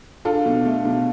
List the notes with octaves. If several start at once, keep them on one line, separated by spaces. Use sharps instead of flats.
D4 F4 A4
B2
A3
B2